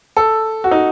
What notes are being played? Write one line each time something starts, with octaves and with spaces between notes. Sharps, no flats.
A4
F#4
D#4